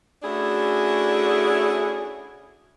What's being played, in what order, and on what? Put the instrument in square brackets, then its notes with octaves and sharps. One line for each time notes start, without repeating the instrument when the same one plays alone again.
[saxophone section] A3 C#4 D4 E4 F#4 G#4